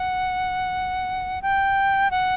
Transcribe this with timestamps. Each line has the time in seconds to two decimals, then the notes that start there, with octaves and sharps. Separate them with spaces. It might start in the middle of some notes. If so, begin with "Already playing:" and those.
Already playing: F#5
1.42 G5
2.11 F#5